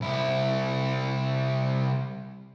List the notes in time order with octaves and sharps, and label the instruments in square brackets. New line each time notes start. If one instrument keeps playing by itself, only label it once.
[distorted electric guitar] C2 E4